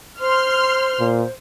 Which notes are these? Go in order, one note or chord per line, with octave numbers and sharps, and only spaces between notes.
C5 C6 F6
A#2